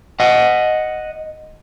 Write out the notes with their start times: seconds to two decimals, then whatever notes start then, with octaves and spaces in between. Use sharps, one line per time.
0.20 D#5 F#5